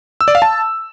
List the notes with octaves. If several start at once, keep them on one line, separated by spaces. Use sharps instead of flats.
E6
D5
F5
A5